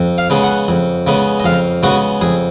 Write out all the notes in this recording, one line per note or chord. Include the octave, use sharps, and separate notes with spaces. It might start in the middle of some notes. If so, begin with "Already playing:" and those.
Already playing: F2
F5
C#3 G#3 B3
F#5
F2
C#3 G#3 B3
D#5
F2 F5
C#3 G#3 B3 F#4
F2 G#4